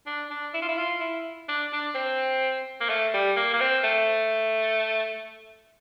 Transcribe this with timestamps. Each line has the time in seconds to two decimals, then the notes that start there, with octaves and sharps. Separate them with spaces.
0.06 D4
0.31 D4
0.54 E4
0.62 F4
0.69 E4
0.78 F4
1.01 E4
1.48 D4
1.72 D4
1.95 C4
2.81 A#3
2.89 A3
3.14 G3
3.36 A#3
3.53 A#3
3.60 C4
3.84 A3